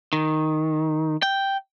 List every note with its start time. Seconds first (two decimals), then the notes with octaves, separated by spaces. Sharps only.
0.13 D#3
1.23 G5